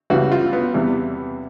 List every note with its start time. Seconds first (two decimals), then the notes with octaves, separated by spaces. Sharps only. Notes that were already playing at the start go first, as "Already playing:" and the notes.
0.10 C#2 C#3 E3 G3 F#4
0.32 F4
0.53 B3
0.74 E2 C3 E3 G3